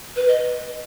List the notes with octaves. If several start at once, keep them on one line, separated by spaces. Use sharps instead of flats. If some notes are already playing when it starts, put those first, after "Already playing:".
B4
D#5